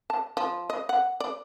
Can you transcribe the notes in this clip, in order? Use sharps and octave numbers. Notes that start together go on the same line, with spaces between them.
A5
F3
D#5
F#5
D5